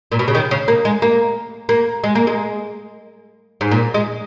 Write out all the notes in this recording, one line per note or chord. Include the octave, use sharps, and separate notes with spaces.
A#2
B2
C#3
D#3
C#3
A#3
G#3
A#3
A#3
G#3
A#3
G#3
G#2
A#2
G#3